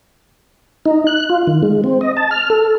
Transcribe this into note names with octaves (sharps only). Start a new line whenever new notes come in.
D#4
F#6
F4
D#3
G#3
C4
D#5
A5
F6
A4